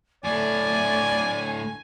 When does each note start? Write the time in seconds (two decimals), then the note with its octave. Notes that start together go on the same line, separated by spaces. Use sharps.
0.24 A2 A3 D4 D5 G#5